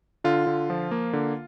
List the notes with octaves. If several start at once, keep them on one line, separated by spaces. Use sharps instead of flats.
D3 F4
D3
F3
A#3
D3